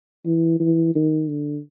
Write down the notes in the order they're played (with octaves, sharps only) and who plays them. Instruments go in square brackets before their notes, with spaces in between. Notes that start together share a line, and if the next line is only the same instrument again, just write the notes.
[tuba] E3
E3
D#3
D3